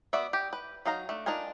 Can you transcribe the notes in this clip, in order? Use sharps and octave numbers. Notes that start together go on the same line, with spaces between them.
B3 F#4 D5 E5
G4
B4
F#3 D#4 F5 A#5
A3 D4
D4 D#4 F4 A#4 G#5